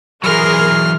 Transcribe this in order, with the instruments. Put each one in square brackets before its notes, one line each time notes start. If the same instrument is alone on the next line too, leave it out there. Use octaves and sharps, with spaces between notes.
[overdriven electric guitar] E3 F#3 [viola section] G#4 A#4 [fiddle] C6 F6